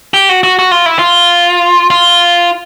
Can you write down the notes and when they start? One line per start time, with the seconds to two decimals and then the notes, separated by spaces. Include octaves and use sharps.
0.14 G4
0.29 F#4
0.43 F#4
0.59 F#4
0.71 F4
0.86 E4
0.99 F4
1.90 F4